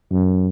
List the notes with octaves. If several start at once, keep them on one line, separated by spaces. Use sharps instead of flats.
F#2